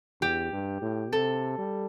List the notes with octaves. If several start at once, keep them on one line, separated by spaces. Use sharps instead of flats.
E2 G4
G2
A2
C3 A4
G3